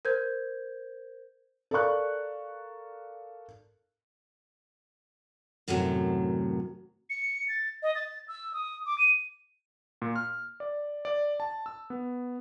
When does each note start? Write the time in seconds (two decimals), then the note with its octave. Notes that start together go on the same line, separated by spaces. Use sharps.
0.05 A#4 C5 G6 G#6
1.71 A4 A#4 D5 F5 C#6 F#6
5.68 F#2 A2 C3 D#3 F#3
7.10 C#7
7.49 A6
7.83 D#5
7.95 A6
8.28 E6
8.53 D#6
8.86 D6
8.98 D#7
10.02 A#2
10.16 F6
10.60 D5
11.05 D5
11.40 A5
11.66 E6
11.90 B3